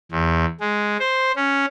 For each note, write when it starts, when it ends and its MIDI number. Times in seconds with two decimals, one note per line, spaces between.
0.11 0.45 40
0.60 0.97 56
0.99 1.31 72
1.36 1.66 61